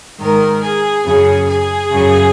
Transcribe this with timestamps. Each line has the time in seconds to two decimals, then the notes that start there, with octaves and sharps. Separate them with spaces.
0.18 G#2 D#3 A#4
0.62 G#4
1.04 F#2 C#3 G#4
1.48 G#4
1.90 F#2 C#3